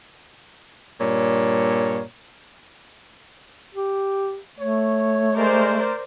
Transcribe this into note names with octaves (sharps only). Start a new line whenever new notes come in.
G2 A#2 C#5
G4
A3 C#5
G#3 A#4 C5 D5